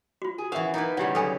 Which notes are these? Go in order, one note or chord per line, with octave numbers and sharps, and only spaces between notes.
F4 F#4
G#4
E3 B3 C#4 F#4 A#4 E5 F5
F#3 A#3 B3 D#4 B4
C#3 F#3 G3 E4 G4 F#5
B2 D3 F#3 F4 A4 G#5